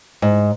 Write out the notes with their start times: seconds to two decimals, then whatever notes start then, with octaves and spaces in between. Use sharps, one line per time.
0.22 G#2